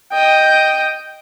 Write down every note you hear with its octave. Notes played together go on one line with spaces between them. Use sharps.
D#5 G5